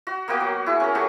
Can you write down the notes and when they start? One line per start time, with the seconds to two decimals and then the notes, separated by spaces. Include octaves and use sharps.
0.07 F#4
0.28 A#3 B3 F#4 G5
0.40 F#3
0.66 E4 G#4
0.80 C#4 A#4
0.95 F#3 A3 C#4 G4